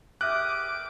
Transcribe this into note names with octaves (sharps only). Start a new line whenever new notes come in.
G4 E5 D6 D#6 F6 F#6